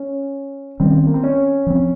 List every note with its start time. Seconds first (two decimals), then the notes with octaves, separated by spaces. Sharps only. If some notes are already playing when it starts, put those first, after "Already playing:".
Already playing: C#4
0.80 D#3 G3 C4 C#4
1.07 A#3
1.14 C4
1.24 C#4
1.67 F3 C4